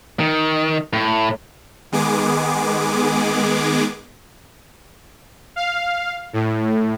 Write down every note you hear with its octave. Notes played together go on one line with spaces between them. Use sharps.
D#3
A2
D#3 G#3 B3 G#4 D6
F5
A2